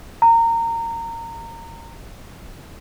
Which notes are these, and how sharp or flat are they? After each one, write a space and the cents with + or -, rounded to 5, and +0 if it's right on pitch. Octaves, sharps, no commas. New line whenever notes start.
A#5 -20